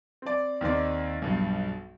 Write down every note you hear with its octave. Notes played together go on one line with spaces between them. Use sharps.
C4 D5
D#2 D#3 C4 D5
B1 G2